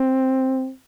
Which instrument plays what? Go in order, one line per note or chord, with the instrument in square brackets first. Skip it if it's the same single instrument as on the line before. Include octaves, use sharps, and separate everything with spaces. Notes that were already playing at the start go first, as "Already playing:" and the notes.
Already playing: [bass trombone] C4